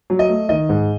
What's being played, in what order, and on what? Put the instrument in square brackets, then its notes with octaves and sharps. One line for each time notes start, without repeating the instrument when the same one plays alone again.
[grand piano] F#3
D#5
A3
D#3 D#5
G#2